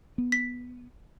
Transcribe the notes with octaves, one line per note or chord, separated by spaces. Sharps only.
B3
B6